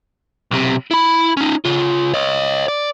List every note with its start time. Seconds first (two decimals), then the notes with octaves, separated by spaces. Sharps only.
0.51 B1 C3
0.91 E4 B5
1.37 C#4 D#4
1.65 C#3 F4
2.13 C#5 D#5
2.68 D5